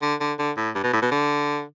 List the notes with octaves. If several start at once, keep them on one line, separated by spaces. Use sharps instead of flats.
D3
D3
D3
A2
G2
B2
A2
B2
D3